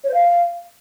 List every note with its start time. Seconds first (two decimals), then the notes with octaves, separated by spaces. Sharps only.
0.04 C#5
0.09 C5
0.14 F5